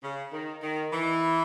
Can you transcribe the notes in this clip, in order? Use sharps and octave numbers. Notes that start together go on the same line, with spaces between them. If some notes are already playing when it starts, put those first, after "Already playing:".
C#3
D#3
D#3
E3